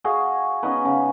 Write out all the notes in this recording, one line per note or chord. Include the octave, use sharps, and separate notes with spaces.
F#4 G#4 D#5 F5
B3 C#4 D#4 B4
C#3